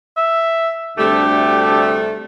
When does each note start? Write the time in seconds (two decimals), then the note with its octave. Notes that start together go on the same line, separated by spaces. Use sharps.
0.17 E5
0.98 D2 C3 G3 A3 D4 G4